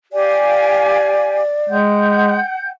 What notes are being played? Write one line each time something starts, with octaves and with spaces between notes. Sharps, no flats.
G4 D5 F5 G#5
G#3 F#5 G5 G6